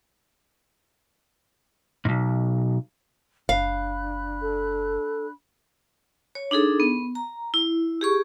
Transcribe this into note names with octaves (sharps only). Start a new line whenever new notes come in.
B1 G#2
F#1 D4 F5 B5 F#6
A4
C#5
D4 D#4 G#4 A4
B3
A#5
E4
G4 G#4 C#6